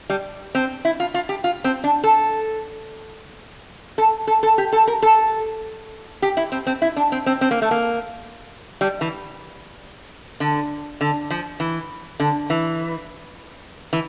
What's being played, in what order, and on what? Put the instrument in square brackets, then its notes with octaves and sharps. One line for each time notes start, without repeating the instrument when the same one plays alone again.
[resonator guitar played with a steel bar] G3
C4
E4
F4
F4
G4
F4
C4
D4
A4
A4
A4
A4
G4
A4
A#4
A4
G4
E4
C4
C4
E4
D4
C4
C4
C4
A#3
A3
A#3
G3
E3
D3
D3
F3
E3
D3
E3
E3